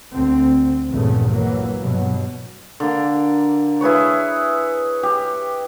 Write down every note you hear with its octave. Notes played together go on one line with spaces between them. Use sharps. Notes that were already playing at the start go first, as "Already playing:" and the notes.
D2 C4
A#1 E2 G2 A#2 C#3 A3
E3 F#3 A#3
G2 B2 F#3
D3 A#3
E4 G#4 B4 C#5
G4